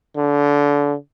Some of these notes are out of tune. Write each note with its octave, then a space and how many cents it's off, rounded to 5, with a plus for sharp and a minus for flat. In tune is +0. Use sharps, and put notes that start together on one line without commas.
D3 -25